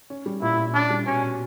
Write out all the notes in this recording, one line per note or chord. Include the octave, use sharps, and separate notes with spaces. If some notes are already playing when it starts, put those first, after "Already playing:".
C#4
G3
A#2 E4
A#2
C#4 D4
G3
B2 C#4
B2